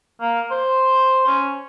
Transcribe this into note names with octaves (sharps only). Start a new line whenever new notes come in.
A#3
C5
C#4